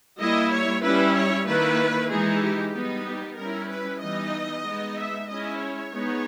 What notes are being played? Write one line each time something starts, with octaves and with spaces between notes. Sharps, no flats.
G3 A#3 E4 D#5
C#5
G3 C#4 E4 B4
C#5
D#3 A#3 E4 B4
E3 G#3 D#4 G#4
G4
G3 B3 D#4
G4
G3 C#4 E4 A#4
B4
E3 G3 B3 D#4 D#5
G#3 B3 D#4
E5
G#3 C#4 E4 D#5
C#5
G#3 B3 D#4